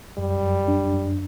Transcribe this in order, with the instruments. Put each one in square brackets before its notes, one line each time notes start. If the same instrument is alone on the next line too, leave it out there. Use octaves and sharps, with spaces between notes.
[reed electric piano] F#2 [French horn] G3
[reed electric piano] F#2
D4
F#2